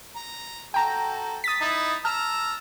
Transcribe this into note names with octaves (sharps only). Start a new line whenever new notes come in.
A#5
F#4 A4 G5 A#5
D#6 A6 B6
D#4 E4
A5 A#5 E6 F6